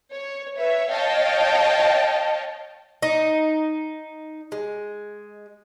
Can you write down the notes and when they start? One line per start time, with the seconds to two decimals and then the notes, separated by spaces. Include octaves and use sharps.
0.14 C#5
0.58 B4 C#5 E5
0.90 C#5 D#5 F5 G5 A5
3.02 D#4
4.52 G#3